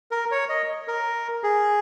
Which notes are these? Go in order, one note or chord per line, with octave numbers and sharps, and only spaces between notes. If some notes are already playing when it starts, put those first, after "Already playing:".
A#4
C#5
D#5
A#4
G#4